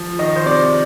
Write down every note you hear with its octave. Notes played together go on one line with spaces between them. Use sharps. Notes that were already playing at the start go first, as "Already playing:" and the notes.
Already playing: F3
D#3 D#5
C5
C3 D5